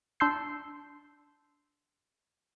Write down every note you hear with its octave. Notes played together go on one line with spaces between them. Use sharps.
D4 A5 C6 E6 G6 C7